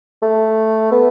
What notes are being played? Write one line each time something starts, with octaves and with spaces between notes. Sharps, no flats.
A3
B3